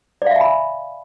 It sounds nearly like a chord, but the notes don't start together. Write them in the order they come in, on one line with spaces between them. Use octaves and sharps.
D5 F5 E5 G#5 B5